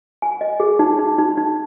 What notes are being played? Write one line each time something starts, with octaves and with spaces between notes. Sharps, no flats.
G#5
D#5
G#4
D#4
D#4
D#4
D#4